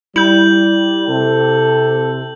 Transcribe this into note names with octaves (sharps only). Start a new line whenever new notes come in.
G3 E4 G6 F#7
C3 A4